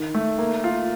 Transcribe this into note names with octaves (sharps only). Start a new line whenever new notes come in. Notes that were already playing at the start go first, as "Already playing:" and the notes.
Already playing: D#3
A3
A#3
F4